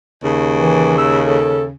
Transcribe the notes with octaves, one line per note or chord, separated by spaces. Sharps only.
D#2 C#3
E3
E6
A4